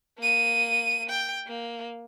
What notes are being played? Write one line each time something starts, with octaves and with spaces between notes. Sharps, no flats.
A#3 D#7
G5
A#3